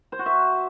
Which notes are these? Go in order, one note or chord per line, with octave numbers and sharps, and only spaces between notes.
C5
F#4
E5